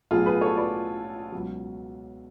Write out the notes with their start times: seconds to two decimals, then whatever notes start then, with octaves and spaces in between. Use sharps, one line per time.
0.11 B1 A2 F#3 F4 G#4
0.26 G#4 B4
0.41 A4 C#5
0.57 B4 D5
1.32 C#2 B2 F#3